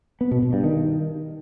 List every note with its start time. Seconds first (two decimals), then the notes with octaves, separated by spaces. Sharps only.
0.21 B3
0.31 B2
0.42 B2
0.53 G2
0.64 D#3